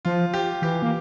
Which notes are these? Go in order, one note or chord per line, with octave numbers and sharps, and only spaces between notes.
F3 F4
G4
E3 G4
A#3